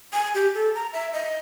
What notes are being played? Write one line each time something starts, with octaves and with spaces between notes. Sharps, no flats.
G#5
G4
A4
A#5
E5
D#5